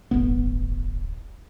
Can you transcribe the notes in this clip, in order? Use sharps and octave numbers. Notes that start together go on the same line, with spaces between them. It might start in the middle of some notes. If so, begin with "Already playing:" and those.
D1 G1 B3